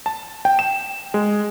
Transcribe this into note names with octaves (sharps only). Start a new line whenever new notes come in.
A5
G5
E7
G#3